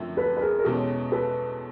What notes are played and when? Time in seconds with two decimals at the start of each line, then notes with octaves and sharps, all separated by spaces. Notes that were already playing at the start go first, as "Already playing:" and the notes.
Already playing: F#2 D3 F3 A3 C4
0.17 A4 B4
0.37 B4
0.41 G#4 A#4
0.59 A#4
0.65 E2 B2 G#3 C#4 G4 A4
1.12 A4 B4